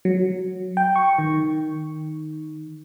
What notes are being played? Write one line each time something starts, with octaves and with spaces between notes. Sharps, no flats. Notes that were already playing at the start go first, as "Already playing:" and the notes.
F#3
G5
C#6
D#3